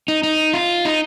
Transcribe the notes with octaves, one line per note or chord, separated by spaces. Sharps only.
D#4
D#4
F4
D#4